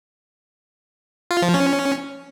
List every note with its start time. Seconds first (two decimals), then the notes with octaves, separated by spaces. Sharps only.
1.31 F4
1.42 F3
1.54 C#4